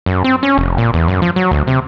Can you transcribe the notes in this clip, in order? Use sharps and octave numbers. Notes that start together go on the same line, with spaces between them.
F#2
C4
C#4
F1
A#2
E2
F#2
F3
F#3
D2
C3